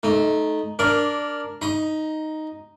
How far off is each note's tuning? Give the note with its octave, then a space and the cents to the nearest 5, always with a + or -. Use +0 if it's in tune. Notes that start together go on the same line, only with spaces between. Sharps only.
A3 -20 D#4 +0
D4 +0 A#4 +0 D5 -15
D#4 +0 A#5 +30